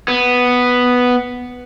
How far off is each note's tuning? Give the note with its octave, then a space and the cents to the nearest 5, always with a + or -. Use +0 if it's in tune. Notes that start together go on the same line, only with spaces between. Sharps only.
B3 +0